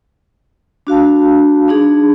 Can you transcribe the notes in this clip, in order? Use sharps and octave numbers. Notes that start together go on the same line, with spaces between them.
D4 F#4 F5 A5
D4 D#4 G#4